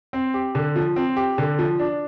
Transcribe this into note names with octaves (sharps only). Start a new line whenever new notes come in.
C4
G4
D3
F3
C4
G4
D3
F3
D4